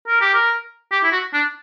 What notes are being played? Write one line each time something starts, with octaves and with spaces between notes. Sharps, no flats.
A#4
G4
A#4
G4
E4
F#4
D4